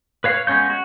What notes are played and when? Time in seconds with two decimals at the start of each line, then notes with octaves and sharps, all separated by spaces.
0.24 B4 C#5 F5
0.47 G#3 B3 C#4 C#5 G6
0.70 F#4